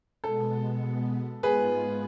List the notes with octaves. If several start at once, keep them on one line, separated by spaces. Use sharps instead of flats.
B2 G#3 B3 A4
G#2 G#3 B3 F4 G#4 B4